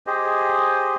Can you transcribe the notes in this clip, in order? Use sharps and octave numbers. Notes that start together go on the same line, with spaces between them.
G4 G#4 C5 D#5